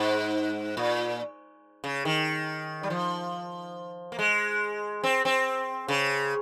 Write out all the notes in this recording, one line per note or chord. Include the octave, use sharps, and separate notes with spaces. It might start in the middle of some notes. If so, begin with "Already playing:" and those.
Already playing: G#2
A#2
C#3
D#3
G3
F3
A#3
G#3
C4
C4
C#3